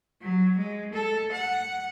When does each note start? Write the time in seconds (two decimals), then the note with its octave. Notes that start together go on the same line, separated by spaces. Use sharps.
0.22 F#3
0.58 G#3
0.93 A4
1.32 F#5